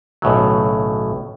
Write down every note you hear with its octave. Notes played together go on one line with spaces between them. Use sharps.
B1 A2 C#3 F#3